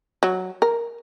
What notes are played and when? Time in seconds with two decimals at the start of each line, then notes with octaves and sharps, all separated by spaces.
0.23 F#3
0.62 A#4